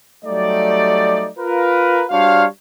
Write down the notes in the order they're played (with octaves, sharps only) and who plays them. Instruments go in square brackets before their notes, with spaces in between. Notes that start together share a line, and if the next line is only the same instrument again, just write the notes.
[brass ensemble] F#3 G3 A3 D#4 G4 D5
F4 A#4 B4
G3 D4 F#4 C5 C#5 F5